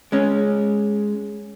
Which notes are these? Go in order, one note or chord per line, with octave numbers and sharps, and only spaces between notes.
G#3 C#4